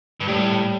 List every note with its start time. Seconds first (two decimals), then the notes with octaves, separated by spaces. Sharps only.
0.20 G2
0.27 A2 G3